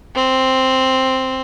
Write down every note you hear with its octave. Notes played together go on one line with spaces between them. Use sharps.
C4